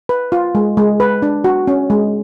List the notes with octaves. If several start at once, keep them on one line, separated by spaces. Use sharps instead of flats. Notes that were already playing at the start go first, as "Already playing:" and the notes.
B4
F4
G#3
G#3
B4
D4
F#4
C#4
G#3